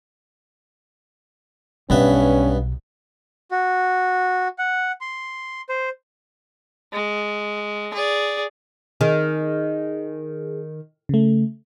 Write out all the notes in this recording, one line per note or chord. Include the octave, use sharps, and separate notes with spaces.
B1 G2 B3 C#4 E5
F#4
F#5
C6
C5
G#3
G#4 D5
D#3 G#4
C#3 A3